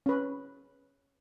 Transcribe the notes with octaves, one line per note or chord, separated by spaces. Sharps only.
C#4 B4